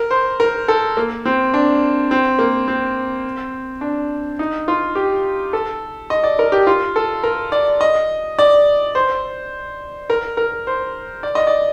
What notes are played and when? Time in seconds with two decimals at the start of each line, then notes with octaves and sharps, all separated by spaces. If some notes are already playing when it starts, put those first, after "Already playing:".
Already playing: A#4
0.11 C5
0.40 A#4
0.68 A4
0.97 A#3
1.25 C4
1.54 D4
2.11 C4
2.39 A#3
2.68 C4
3.81 D4
4.39 D#4
4.68 F4
4.95 G4
5.53 A4
6.10 D#5
6.24 D5
6.39 A#4
6.52 G4
6.67 F4
6.96 A4
7.23 A#4
7.52 D5
7.81 D#5
8.39 D5
8.95 C5
10.10 A#4
10.37 A#4
10.67 C5
11.23 D5
11.35 D#5
11.47 D5